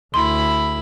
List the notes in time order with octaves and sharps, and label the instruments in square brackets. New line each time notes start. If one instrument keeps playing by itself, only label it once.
[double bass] D2 [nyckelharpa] E4 B5 [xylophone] C6